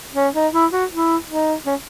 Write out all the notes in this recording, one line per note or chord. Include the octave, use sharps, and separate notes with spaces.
C#4
D#4
E4
F#4
E4
D#4
C#4